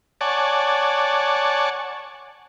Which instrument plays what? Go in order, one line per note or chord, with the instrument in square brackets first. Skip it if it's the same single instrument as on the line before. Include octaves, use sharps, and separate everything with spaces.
[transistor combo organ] C#5 D5 F#5 G#5 A5